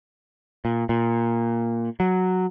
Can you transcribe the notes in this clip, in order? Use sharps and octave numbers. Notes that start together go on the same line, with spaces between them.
A#2
A#2
F#3